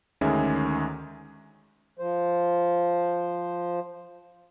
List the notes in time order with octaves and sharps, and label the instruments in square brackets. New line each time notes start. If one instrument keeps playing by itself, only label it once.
[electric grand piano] D2 D#3 G#3 C#4 G#4 E5
[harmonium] F3 C5